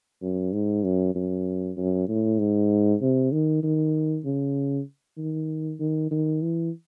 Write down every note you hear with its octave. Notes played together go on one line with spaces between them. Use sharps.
F#2
G#2
F#2
F#2
F#2
A2
G#2
C3
D#3
D#3
C#3
D#3
D#3
D#3
E3